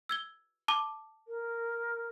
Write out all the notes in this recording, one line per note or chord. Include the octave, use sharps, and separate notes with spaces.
E6 G#6 G7
A5 D6 G7
A#4